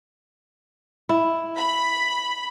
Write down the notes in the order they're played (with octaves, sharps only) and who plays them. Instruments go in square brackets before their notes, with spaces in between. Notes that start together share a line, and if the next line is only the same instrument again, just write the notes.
[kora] E4
[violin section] B5